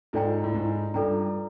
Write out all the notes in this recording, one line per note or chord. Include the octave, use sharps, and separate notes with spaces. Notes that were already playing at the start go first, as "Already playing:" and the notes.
G#2 F4 A4 D5 G5 A#5
A2
G#2
G2 F4 A4 D5 G5 A#5